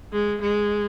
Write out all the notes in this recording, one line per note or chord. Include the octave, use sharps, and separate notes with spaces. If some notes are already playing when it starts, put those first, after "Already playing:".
G#3
G#3